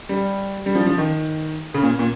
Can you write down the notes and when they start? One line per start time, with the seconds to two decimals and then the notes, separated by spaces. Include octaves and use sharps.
0.09 G3
0.66 G3
0.75 F3
0.86 F3
0.98 D#3
1.74 C#3
1.83 A#2
1.99 A#2